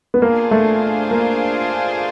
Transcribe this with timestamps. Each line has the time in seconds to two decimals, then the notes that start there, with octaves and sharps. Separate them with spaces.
0.14 B3
0.22 A#3 D4 F4 G#4 C5 F5
0.51 A3
1.11 A#3